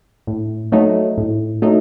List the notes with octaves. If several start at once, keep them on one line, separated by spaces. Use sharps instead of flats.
A2
F#3 A3 D#4
A2
F#3 A3 D#4